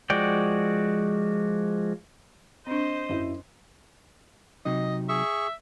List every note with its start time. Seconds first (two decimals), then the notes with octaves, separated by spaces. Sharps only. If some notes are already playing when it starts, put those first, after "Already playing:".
0.10 F3 G#3 F#4 D5 G5
2.67 C4 D4 C5 D#5
3.09 F#2 E4
4.65 C3 F#3 D#4 D#5
5.09 G#4 E5 C#6